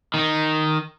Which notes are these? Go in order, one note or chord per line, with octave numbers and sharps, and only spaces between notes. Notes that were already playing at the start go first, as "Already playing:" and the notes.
D#3 D#4